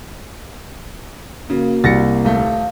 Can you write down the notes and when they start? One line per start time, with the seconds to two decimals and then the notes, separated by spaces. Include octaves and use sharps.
1.50 C#3 A#3 F#4
1.84 C2 A6 A#6 C#7
2.25 D#1 A3 F5